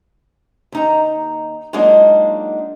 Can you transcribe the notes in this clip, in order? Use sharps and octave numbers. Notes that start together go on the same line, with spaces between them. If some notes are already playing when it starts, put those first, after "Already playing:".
D#2 D#4 A#5
F#3 G#3 A#3 D4 D#4 F4